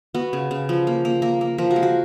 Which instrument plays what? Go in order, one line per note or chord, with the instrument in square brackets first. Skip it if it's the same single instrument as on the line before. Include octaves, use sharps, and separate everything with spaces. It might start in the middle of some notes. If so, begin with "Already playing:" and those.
[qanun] B3 F#4
C#3
C#3
F3
A#3
A#3
A#3 A#4
A#3
F3 A#4
F#4
G#3
F#4